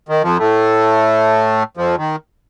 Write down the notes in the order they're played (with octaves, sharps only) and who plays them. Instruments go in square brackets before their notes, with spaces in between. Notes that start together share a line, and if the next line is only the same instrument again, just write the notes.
[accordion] D#3
F2 F3
A2 A3
F2 F3
D#3